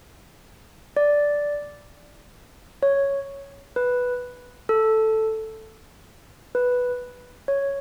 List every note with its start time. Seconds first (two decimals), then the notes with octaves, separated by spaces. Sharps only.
0.97 D5
2.83 C#5
3.76 B4
4.69 A4
6.55 B4
7.48 C#5